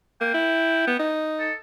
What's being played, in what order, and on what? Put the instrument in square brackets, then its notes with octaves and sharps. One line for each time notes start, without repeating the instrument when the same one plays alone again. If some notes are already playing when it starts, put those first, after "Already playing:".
[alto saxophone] A#3 [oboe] G5
[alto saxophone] E4
B3
D#4
[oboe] A4